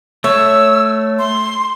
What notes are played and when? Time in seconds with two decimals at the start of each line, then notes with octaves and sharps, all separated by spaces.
0.24 A3 C#5 E6
1.19 C6